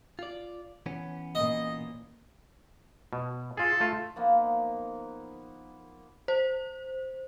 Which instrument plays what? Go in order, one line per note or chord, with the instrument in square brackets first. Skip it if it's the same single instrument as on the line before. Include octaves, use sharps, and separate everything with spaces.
[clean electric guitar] F4 D5
E3 B3 C#4
[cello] A#2 [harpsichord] D#5
[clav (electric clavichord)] B2
[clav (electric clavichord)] F4 G#4 [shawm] A4
[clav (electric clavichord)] A3 F4
[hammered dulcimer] F3 A#3 B3 D#4
[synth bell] C5